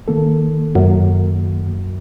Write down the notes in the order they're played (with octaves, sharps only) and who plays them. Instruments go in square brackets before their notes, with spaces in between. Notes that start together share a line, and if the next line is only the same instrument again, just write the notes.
[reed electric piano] D#3 A#3 A4
[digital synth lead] F#2